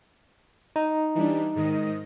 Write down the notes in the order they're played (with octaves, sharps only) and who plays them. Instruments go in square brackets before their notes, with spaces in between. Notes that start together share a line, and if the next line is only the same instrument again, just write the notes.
[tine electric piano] D#4
[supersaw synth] E3 G3 D4
G#2 D#3 D#5